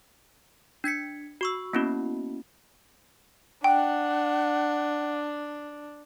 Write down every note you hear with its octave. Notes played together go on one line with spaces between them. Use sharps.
D4 G#6 B6 C#7
F#4 C#6 E6
A#3 B3 C#4 E4 F#4
D4 F#5 G5